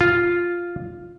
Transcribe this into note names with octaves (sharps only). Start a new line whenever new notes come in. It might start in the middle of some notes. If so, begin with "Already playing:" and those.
F4